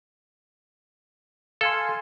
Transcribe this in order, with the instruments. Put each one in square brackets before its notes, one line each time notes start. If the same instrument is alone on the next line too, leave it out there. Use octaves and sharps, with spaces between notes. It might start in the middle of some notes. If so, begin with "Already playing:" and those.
[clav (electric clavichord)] A4 [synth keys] F5 G#5 C6